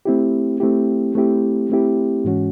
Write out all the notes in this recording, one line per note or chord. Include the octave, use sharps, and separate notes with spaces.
A3 C4 E4 G4
A3 C4 E4 G4
A3 C4 E4 G4
A3 C4 E4 G4
G#2 E3 G#3 C#4 F#4